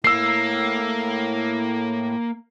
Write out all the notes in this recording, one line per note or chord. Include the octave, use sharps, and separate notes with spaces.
A2 A#3 E6 C7